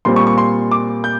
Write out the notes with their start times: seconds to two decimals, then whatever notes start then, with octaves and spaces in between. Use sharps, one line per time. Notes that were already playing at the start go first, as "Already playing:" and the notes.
0.05 A#2 G3 C4 C6
0.16 C#6
0.27 C#6
0.38 C6
0.71 D6
1.04 G6